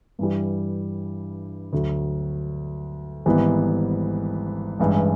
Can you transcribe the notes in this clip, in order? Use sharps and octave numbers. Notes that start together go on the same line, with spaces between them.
G2 E3 G3
D2 D3 F#3
G#1 G#2 E3 G3 B3
A1 G2 E3 G#3